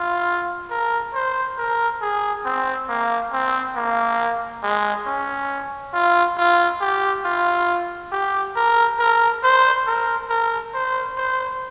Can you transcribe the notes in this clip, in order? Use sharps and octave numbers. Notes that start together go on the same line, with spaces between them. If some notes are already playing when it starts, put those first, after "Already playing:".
Already playing: F4
A#4
C5
A#4
G#4
C4
A#3
C4
A#3
G#3
C#4
F4
F4
G4
F4
G4
A#4
A#4
C5
A#4
A#4
C5
C5